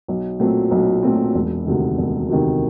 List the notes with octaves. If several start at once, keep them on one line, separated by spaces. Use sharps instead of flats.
B1
A#2 F#3 A3 C4
B1
A#2 F#3 A3 C4
E1
D2 C3 D#3
E1
D2 C3 D#3